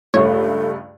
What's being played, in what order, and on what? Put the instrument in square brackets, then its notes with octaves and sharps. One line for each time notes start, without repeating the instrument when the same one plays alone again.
[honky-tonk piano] C#2 G2 A3 [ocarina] A4 [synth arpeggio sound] C#5